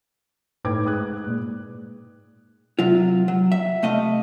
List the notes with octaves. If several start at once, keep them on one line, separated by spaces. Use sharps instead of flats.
A2 D#4 B4 G5 D6 G#6
G#2 B4 D#6 F#6
A#2 G#3
C3 F#3 F4
F#3
E5
C3 A3 D#5 F5